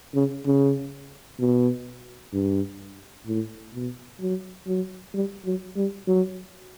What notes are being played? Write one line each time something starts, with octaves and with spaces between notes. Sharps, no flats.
C#3
C#3
B2
G2
A2
B2
F#3
F#3
G3
F#3
G3
F#3